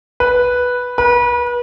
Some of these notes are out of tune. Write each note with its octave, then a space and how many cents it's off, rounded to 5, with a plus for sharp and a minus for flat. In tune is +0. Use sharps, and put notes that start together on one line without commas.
B4 -5
B4 -35